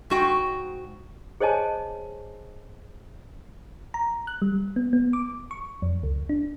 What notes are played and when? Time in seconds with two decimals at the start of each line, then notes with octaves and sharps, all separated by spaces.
0.10 G#2 F#4 G5
1.40 G#4 C5 C#5 D#5 G#5 A5
3.94 A#5
4.27 F#6
4.42 G3
4.76 B3
4.93 B3
5.13 D6
5.51 C#6
5.82 F2
6.03 C#2
6.29 D4